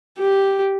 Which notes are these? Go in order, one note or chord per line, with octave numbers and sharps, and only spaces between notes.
G4